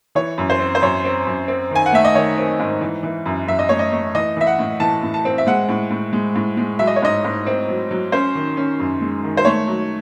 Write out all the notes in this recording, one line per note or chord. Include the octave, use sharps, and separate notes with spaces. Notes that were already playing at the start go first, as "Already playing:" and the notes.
E3 C#5
F#2
C5
C4
C5
F#2 C#5
C4
F#2
C4
D#3 G#5
F#5
A3 E5
D#5
D#3 C#5
C4
G#2
E3
E3
F#2
F#2 E5
D#5
A3 C#5
D#5
A3
E3 D#5
E3 E5
F#5
A2
E3 A5
A2
A5
C4
E5
G#3 F#5
A2
A2
G#3
A2
G#3
F#3 E5
D#5
C#5
G#2 D#5
G#2
C4
F#3
F#3
C#4 C5
D#3
C#4
F#2
G#3
D#3
C5
A3 C#5
F#3